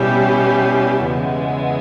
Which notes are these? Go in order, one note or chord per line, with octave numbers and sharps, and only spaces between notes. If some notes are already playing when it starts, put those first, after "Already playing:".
Already playing: B2 G3 C#4 E4 G4
E2 C#3 E3 G#3 B3